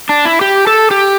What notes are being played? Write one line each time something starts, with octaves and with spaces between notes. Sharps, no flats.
D4
E4
G4
A4
G4